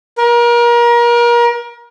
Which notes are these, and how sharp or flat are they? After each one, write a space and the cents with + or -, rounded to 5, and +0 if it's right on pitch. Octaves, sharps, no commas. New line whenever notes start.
A#4 +35